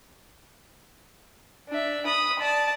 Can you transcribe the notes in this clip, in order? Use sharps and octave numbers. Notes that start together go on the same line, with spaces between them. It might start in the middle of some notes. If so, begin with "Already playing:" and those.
D4 E5
B5 D#6
D5 A5